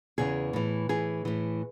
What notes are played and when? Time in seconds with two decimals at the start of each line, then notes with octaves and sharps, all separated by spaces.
0.18 E2 C#3 E3 G#4
0.53 A2 E3
0.89 A2 E3 G#4
1.25 A2 E3